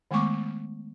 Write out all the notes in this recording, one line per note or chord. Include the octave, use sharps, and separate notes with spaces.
D#3 G#3 A3 B3 C#6 D6